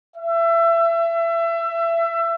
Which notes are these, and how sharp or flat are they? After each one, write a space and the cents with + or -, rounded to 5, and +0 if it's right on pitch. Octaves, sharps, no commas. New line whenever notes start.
E5 +25